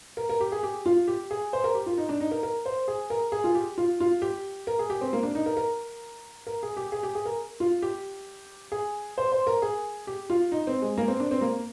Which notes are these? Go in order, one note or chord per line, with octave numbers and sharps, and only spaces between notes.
A#4
A#4
G4
G#4
G4
F4
G4
G#4
C5
A#4
G4
F4
D#4
D4
D#4
A#4
A#4
C5
G#4
A#4
G#4
F4
G4
F4
F4
G4
A#4
G#4
G4
C4
A#3
D4
D#4
A#4
A#4
A#4
G#4
G4
G#4
G4
G#4
A#4
F4
G4
G#4
C5
C5
A#4
G#4
G4
F4
D#4
C4
G#3
A#3
C4
D4
C4
A#3